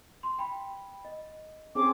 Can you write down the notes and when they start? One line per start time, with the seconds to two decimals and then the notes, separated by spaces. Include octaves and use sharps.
0.23 C6
0.39 G5 B5
1.05 D#5
1.75 C4 C#4 G#4 D6